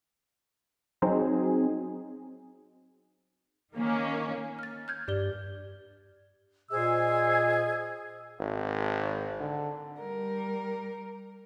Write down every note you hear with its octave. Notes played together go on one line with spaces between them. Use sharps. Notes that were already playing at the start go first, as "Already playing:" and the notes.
F#3 C4 D#4 G#4
D#3 A#3 C#4
F6 A6
F6 G6 G#6
G2 G4 D5 G7
A#2 G#4 C5 D#5 E6
G#1
D3
G3 A#4